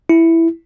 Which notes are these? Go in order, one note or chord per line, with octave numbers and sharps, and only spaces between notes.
E4